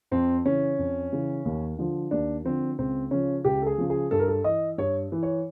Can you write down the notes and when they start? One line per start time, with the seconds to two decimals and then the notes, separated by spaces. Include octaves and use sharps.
0.11 F2 C4
0.45 C#3 E3 C#4
0.79 F2
1.12 C#3 E3
1.45 D#2
1.79 D3 F3
2.11 D#2 D4
2.44 D3 F3 C4
2.78 C#2 C4
3.11 C#3 F3 C#4
3.45 C#2 G4
3.62 A4
3.67 G#4
3.78 C#3 F3
3.90 G#4
4.11 G2 A4
4.19 A#4
4.28 A4
4.44 E3 D#5
4.78 G2 C#5
5.12 E3
5.23 C#5